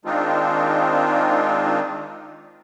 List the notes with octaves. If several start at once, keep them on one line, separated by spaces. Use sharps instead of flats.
D#3 G#3 C4 D4 D#4 F4